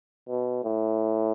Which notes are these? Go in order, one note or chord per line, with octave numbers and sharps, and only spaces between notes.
B2
A2